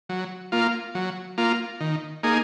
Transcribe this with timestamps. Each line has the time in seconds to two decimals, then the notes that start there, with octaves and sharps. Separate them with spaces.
0.09 F#3
0.52 A#3 F4
0.95 F#3
1.38 A#3 F4
1.80 D#3
2.23 A#3 D#4 G#4